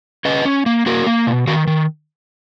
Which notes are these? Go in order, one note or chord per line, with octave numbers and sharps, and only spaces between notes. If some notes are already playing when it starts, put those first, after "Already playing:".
C#4 B4 D#5
C#4
A#3
A#3 F#4 A#4
A#3
B2
D#3 F#4 A#4
D#3